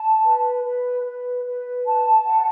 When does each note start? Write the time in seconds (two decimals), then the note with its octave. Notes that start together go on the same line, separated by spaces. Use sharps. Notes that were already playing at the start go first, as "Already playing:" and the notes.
Already playing: A5
0.24 B4
0.64 B4
1.04 B4
1.45 B4
1.85 A5
2.26 F#5